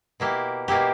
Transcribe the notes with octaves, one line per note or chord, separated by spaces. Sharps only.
B2 A#3 E4 G4
B2 A#3 E4 G4